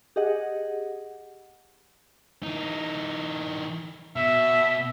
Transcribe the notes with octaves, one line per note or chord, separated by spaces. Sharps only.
G4 G#4 D#5 F#5
E3 D#4
B2 E5